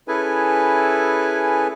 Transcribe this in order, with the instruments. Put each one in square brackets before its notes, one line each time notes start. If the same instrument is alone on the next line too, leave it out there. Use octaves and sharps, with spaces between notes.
[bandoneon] C#4 E4 G#4 A4 B4 G#5